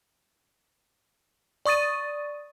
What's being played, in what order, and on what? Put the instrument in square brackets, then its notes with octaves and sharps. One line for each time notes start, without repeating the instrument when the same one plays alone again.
[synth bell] D5 C#6 D#6 A6 D#7